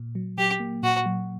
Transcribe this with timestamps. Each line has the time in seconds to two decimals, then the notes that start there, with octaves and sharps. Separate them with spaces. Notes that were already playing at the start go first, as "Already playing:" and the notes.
Already playing: A#2
0.15 F#3
0.38 F#3 G4
0.60 A#3
0.83 A#2 F#4
1.06 F#3